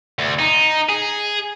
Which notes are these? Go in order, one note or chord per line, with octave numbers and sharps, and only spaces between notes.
D2
D#4
G#4